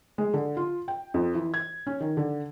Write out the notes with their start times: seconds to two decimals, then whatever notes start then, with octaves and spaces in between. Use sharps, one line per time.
0.18 G#3
0.34 D3
0.57 F4
0.88 G5
1.14 F2
1.35 E3
1.54 G#6
1.87 C#4
2.00 D#3
2.17 D3